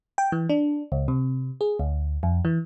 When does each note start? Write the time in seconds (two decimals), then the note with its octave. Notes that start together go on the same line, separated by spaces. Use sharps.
0.18 G5
0.32 E3
0.50 D4
0.92 C#2
1.08 C3
1.61 G#4
1.79 D2
2.23 F2
2.45 E3